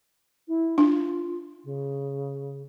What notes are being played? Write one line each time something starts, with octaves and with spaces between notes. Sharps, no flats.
E4
D4 F4
C#3